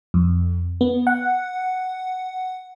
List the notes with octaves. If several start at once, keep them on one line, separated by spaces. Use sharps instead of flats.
F2
B3
F#5